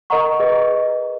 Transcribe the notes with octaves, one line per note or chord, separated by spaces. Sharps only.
A#4 D#5 F#5 A#5 C#6
G#4 B4 D#5